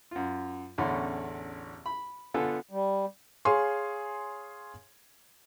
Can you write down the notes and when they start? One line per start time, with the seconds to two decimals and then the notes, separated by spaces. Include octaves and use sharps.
0.11 F#2 F4
0.78 A1 E2 D3 C#4 B5 C6
1.86 B5
2.34 D3 B3 F4 A4 G#5
2.70 G3
3.45 G#4 C#5 F5 G#5 C6